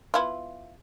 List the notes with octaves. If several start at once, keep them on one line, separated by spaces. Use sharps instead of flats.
B3 E4 F4